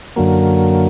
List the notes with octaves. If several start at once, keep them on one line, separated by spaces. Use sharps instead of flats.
F#2 D3 F#3 A#3